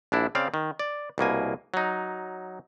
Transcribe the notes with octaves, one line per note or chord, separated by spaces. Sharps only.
A#1 D4 E4
C#3 C4 D5 F5
D#3
D5
C2 B2 A#3 G#5
F#3 D#4